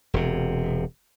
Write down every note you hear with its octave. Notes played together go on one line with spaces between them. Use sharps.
E1 C3